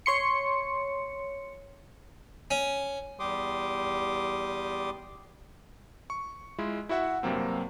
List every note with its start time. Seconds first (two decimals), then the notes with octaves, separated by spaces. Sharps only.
0.06 C#5 C6 C#7
2.51 C#4
3.20 E2 G3 G4 C6 D6 D#6
6.10 C#6
6.58 G#3 E4 F4
6.89 E4 F#4 E5 F#5
7.23 G2 C3 F#3 A#3 C4